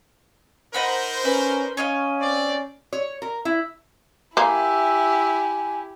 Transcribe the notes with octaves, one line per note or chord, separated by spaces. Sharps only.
D#4 A#4 C5 D#5 F#5 B5
C#4 B4
C#4 C#5 D#5 F5
C4 D5
C#5
A#4
E4
A#3 E4 G4 E5 F5 G#5